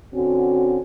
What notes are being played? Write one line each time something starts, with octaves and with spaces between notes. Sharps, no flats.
D3 C4 C#4 F#4